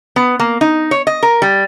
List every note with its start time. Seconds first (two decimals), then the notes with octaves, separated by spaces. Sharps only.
0.16 B3
0.40 A#3
0.61 D#4
0.91 C#5
1.07 D#5
1.23 A#4
1.42 G3